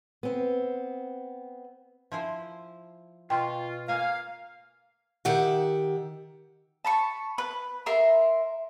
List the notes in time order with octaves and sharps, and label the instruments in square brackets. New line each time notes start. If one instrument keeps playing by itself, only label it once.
[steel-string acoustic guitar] B3 C4
[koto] F3 E4 C5
[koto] B2 [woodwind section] F4 [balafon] G5 C6
[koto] A#3 G#5 A#5 [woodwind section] F5
[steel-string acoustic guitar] D#3 G4 E5 F#5
[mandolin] A5 B5 C#6
B4
A#4 E5 C6